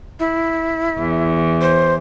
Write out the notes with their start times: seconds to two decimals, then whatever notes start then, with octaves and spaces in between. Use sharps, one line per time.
0.20 E4
0.98 E2
1.61 C5